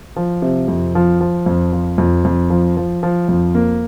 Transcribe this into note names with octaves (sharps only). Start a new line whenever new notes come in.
F3
C3
F2
F3
F3
F2
F3
F2
F2
F3
F3
F3
F2
A#3